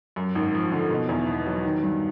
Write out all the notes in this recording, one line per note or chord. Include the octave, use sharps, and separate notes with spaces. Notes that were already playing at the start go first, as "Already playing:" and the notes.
F#2
G#1
F3
D3
B2
E2
B3
F#3
D#3
G2